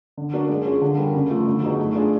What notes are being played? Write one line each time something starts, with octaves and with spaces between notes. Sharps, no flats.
D3
F#3 A#3 D4 F#4
G#3
C#4 F4 G#4
D3
G3 A#3
C#3
F3 A3
D3
F#3 B3 D#4 G#4
A3
D4 F4 G#4